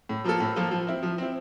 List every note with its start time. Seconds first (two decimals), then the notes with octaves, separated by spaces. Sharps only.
0.09 A2
0.24 F3 A#3 F4 A4
0.40 A2
0.56 F3 A#3 F4 A4
0.71 F3
0.87 C4 E4
1.03 F3
1.18 C4 E4